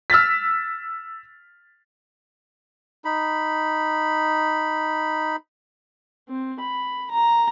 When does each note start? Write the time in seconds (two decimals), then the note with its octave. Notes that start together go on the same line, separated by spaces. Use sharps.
0.10 E6 F6 A6 B6
3.05 D#4 B5
6.29 C4
6.60 B5
7.11 A#5